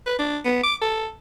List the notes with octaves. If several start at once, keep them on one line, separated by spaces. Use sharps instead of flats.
B4
D4
B3
D6
A4